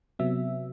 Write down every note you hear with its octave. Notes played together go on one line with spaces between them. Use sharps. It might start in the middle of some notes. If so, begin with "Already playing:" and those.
C3 F#3 B3 E5